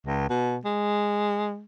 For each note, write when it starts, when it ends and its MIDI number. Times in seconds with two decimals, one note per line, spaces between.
0.06 0.24 37
0.29 0.58 47
0.65 1.62 56